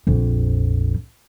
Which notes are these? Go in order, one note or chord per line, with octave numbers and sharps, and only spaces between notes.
A#1 F2